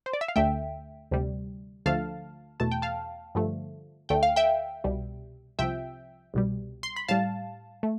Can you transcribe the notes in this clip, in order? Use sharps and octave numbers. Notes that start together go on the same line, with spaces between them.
C5
D5
E5
F5
D2 D3 A3 E5 G5
D2 C3 G3
D2 D3 F3 A3 F5 A5
E2 B2 A3 A5
G5
F5 A5
G2 D3 F3 A3
D2 D3 A3 G5
F5
E5 G5
C2 B2 G3
C2 C3 F3 E5 G5
C2 B2 G3
C6
B5
A2 G3 F5 A5
A3